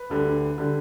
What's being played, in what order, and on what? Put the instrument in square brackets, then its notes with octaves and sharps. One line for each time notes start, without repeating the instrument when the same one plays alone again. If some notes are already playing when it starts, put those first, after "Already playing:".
Already playing: [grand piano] B4
D2 D3 G3
D3 G3